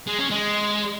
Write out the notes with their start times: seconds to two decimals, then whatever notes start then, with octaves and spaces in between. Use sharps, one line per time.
0.07 G#3
0.19 C#4
0.30 G#3